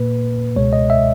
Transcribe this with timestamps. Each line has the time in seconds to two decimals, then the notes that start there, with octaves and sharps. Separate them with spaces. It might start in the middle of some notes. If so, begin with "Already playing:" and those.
Already playing: A#2 A#3 B4
0.56 C#2 B2 G#3 C#5
0.73 D#5
0.90 E5